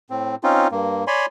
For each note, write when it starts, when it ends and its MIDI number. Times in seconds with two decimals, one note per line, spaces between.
0.10 0.36 45
0.10 0.36 60
0.43 0.68 60
0.43 0.68 61
0.43 0.68 63
0.43 0.68 65
0.71 1.04 43
0.71 1.04 58
1.07 1.26 73
1.07 1.26 74
1.07 1.26 80
1.07 1.26 83
1.07 1.26 84